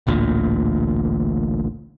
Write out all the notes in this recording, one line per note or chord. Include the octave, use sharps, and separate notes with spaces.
D1 A1 D2 A#2